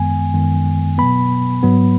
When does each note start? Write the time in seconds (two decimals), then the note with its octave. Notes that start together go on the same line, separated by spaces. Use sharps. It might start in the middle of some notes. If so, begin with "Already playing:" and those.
Already playing: F#2 D#3 G#3 B3 G#5
0.34 F#2 D#3 G#3 B3
0.98 B2 F#3 B3 B5
1.63 G#2 F#3 B3